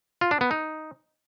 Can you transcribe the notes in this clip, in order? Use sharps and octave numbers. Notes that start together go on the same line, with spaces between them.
F4
D4
B3
D#4